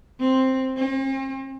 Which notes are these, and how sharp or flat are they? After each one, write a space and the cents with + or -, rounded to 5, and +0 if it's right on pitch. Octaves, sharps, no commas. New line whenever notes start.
C4 +5
C4 +45